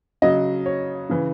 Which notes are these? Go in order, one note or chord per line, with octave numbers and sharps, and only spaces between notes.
C#3 F#3 D#5
C#5
C#3 E3